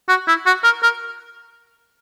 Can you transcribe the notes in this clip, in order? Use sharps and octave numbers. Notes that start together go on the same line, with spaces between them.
F#4
E4
F#4
A#4
A#4